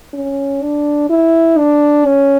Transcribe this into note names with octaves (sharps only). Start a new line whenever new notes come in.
C#4
D4
E4
D4
C#4